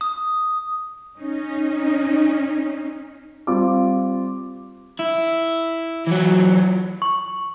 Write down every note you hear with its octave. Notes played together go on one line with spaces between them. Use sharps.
D#6
C#4 D#4
G3 C4 F4 D6
E4
E3 F#3
C#6